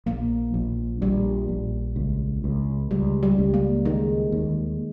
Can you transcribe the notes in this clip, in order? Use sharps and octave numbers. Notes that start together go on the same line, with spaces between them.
A#1 A#3
A#1
A#1 G3
A#1
C#2
C#2
C#2 G3
G3
C#2
A#3
D#3 G#3
D#2